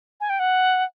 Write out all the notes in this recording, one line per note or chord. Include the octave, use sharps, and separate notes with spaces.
G#5
G5
F#5